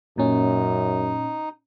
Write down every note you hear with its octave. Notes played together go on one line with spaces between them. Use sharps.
F#2 A#2 C#4 D#4